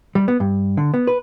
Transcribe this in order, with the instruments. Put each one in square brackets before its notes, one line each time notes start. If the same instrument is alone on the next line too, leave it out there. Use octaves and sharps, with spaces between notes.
[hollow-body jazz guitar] G3
B3
G2
D3
B3
B4